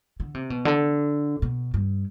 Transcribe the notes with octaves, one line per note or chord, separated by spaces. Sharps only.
D3
C3
B2
D3
B2
G2